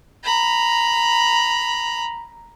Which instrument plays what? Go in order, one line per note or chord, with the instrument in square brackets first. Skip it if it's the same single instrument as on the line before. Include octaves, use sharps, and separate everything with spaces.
[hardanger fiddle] A#5 B5